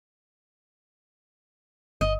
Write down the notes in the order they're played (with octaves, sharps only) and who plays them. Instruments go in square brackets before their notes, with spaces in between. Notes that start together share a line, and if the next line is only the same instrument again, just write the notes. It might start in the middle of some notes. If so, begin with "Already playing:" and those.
[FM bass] G1 [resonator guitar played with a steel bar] D#5